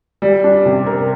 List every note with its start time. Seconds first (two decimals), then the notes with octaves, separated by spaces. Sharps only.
0.22 G3
0.44 D4
0.66 C3
0.86 A#4